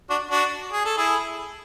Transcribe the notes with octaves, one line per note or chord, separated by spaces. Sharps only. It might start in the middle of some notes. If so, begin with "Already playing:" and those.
D4 F#4
D4 F#4
G#4
A4
E4 G#4